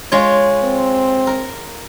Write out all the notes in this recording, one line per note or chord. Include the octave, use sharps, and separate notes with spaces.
G#3 F4 C#5
C4
A#4